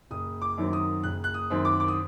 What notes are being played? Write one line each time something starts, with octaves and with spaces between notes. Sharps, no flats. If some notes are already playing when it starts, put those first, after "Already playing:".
F#1 D#6
D6
F#2 D#3 F#3 C4
D#6
F#1 F#6
F#6
D#6
F#2 D#3 F#3 C4
D6
D6
D#6